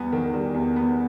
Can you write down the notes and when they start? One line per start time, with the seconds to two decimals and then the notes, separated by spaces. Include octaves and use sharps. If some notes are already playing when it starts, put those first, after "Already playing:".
Already playing: E2 G3 B3
0.13 D#3
0.34 G3
0.54 E2
0.76 B3